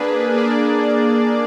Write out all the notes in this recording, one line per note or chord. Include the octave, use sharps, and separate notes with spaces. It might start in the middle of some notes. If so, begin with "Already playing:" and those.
Already playing: A#3 D4 G#4 B4
A#3 D4 G#4 D5